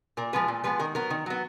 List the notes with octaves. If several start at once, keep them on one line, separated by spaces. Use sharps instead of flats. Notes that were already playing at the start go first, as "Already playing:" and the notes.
A#2 A#4
F3 G#3 B3 B4
A#2
F3 G#3 B3 B4
D#3 A#4
F#3 B3 A#4
D#3
F#3 B3